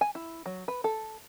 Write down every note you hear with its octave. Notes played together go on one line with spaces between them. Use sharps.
G#5
E4
F#3
B4
A4